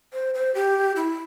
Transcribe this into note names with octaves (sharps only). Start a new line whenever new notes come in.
C5
C5
G4
E4